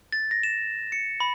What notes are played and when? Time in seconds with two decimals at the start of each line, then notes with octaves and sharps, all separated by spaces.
0.12 A6
0.31 A#6
0.43 E7
0.92 C#7
1.20 B5